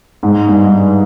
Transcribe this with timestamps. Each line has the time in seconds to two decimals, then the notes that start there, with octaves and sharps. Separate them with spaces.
0.23 G#2
0.48 G2